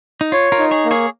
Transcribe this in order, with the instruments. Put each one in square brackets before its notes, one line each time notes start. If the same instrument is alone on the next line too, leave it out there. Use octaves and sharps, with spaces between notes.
[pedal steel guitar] D#4
[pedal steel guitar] F4 [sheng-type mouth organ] C#5
[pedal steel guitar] F4 A#4
[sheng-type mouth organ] D#4
[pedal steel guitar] G#4 C#5
[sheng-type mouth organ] A#3
[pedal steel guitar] G#4 C#5